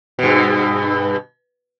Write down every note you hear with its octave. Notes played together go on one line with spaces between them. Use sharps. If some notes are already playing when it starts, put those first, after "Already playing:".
G2 B2